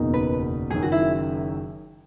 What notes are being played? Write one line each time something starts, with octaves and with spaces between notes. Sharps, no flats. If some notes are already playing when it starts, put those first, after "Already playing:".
Already playing: F#1 E2 B2 A#3 D#4
B4
F#1 F#2 D#3 G#4
F#4
E4